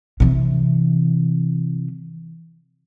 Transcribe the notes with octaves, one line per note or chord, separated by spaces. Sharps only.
C3 E3